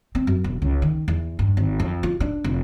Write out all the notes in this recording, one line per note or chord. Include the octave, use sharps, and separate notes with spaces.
C4
F#2
E1
C#2
D#3
E2
G2
G#1
F2
F4
D4
F1